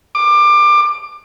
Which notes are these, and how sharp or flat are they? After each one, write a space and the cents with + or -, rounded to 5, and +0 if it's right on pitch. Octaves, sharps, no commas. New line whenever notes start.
D6 +20